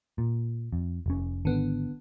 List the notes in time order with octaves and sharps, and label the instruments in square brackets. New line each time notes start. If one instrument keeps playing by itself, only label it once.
[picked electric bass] A#2
F2
F1 C#4
[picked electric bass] G#1 [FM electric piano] D3 B3